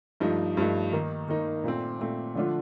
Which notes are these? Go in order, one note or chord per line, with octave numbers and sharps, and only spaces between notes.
G2 F3 A3 D#4
G2 F3 A3 D#4
D#3 A#3 D#4
D#3 A#3 D#4
A#2 A3 C4
A#2 A3 C4
D3 F3 A3 D4 F4